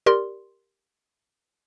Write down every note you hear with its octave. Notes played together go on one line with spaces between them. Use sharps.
G4 A#4 D5 C6